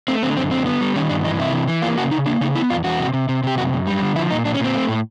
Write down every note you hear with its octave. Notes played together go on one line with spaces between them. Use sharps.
A3 C4
D3 C4
F#2 C4
D3 C4
B3
G3
D#3 C#4
G2 D4
E3 D#4
C3 E4
E3
E3
A#3 F4
C#3 F#4
C#3 D#4
A#3 D4
C#3 D#4
B3 E4
E2 F4
E2 F#4
C3
C3
C3
C3 G4
F#2 F#4
F#2
G3
D3
F3 E4
A#2 D#4
A#2 D4
C#4
A#2 C4
A3
A2